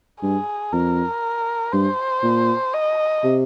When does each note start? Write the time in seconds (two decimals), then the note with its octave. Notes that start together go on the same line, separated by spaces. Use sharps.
0.22 G2 G#4
0.73 F2 A#4
1.73 G2 C5
2.23 A#2
2.74 D#5
3.24 C3